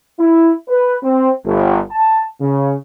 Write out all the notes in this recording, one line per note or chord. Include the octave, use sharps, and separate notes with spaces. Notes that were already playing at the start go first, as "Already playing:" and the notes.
E4
B4
C4
G1
A5
C#3